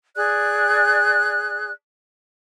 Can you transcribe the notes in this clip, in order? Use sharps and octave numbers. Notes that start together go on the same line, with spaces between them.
G#4 D5 F#6